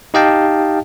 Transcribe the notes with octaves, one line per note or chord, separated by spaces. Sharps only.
D#4 G4 D#5 F5 G5 A5